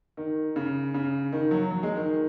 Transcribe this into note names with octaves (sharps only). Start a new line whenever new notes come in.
D#3
C#3
C#3
D#3
F#3
F#3
G#3
D#3